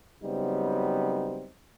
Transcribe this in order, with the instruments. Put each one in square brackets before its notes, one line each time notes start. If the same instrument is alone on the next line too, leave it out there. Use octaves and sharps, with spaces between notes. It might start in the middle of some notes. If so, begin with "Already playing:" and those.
[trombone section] C#3 F#3 G3 B3 C4 D#4